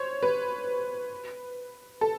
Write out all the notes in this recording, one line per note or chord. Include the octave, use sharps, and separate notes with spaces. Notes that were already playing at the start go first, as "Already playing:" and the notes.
Already playing: C5 C#5
B4
A4